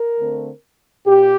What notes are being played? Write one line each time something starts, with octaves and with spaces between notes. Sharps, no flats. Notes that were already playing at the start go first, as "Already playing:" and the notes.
Already playing: A#4
D3 A3 C4
A#2 G4